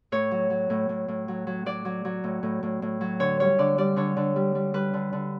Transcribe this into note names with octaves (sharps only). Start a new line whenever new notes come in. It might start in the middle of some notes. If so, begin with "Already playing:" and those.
A2 C#5
F#3
F#3
A2
A2
A2
F#3
F#3
F#3 D5
F#3
F#3
A2
A2
A2
A2
F#3
D3 C#5
G3 C#5
D3 D5
G3 D5
D3 C#5
D3
G3
G3
G3 B4
D3
D3